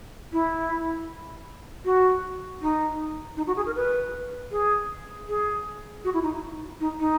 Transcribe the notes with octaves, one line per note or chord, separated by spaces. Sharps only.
E4
F#4
D#4
D#4
F#4
G#4
A#4
B4
G#4
G#4
F#4
E4
D#4
D#4
D#4